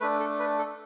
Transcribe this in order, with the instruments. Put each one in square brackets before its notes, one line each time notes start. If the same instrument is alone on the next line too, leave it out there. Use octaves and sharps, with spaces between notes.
[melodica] A3 D4 B4
A4
B4
A4